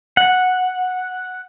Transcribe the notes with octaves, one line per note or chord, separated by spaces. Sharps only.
F#5